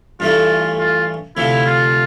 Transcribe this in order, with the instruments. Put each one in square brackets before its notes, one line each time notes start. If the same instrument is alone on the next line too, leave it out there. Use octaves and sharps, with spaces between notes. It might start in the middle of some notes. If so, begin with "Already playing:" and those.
[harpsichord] G2 E3 A3 [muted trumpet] F4
[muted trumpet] F4
[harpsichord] D2 C3 F3 [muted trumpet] E4
[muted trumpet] F4